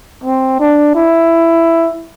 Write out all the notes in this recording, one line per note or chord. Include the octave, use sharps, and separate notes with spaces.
C4
D4
E4